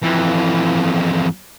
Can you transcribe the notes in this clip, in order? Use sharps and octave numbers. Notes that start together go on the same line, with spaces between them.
F2 E3